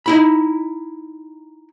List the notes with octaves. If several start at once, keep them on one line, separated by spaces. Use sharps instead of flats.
D#4 E4 B5